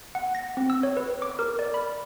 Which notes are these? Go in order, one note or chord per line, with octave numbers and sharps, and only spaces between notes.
F#5
A#6
C4
E6
C#5
B4
D6
A#4
D5
B5